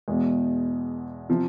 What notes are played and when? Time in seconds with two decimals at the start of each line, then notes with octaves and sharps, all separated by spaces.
0.08 E2 B2 G#3
1.29 C3 F3